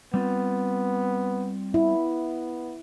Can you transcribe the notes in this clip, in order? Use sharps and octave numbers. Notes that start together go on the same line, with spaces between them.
G3 B3 C4 F4
B3 E4